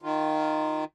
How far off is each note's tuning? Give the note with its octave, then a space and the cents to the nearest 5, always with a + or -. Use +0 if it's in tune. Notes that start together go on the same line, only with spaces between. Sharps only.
D#3 -5 F4 +0